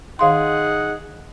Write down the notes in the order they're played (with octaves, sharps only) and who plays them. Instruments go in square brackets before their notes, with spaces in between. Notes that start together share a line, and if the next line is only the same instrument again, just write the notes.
[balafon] D#3 F5 C6 [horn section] D#4 G#4 F#5